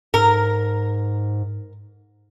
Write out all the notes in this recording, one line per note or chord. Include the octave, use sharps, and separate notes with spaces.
G#2 A#4